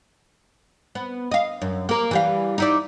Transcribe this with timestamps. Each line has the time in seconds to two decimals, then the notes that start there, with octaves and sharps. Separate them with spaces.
0.95 B3
1.31 D#5 F5
1.62 F#2
1.89 A#3 A#4
2.11 E3 G3 F5
2.58 D#4 E4 D5